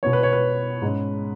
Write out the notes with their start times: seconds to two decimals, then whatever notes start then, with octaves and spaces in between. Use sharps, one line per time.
0.03 B2 B3 C#5
0.13 B4
0.23 C#5
0.33 B4
0.82 G#2 G#3 C#4